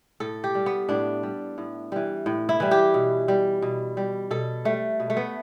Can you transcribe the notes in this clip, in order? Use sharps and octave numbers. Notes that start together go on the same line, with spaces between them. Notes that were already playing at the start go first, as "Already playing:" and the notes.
A2 A4
G4
G3
B3
A2 D4
G3
A2
E3 G3
A2
E4
E3 G3
G4
B2
G3
B2
G3
B2 A4
G3 A3
B2
A3
B3